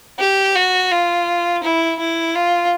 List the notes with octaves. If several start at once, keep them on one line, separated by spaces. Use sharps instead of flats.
G4
F#4
F4
E4
E4
F4